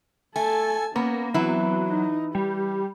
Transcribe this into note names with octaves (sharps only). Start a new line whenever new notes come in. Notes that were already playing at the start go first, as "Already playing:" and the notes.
A3 A4 G#5 A5
A#3 B3 C#4
E3 F#3 B3 C4 E4
D#4
G3 G4